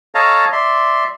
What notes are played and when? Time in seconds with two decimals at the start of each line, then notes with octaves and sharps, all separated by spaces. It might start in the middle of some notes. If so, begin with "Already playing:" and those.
0.15 A4 C#5 D#5 F5 A5 A#5
0.52 D5 E5 C6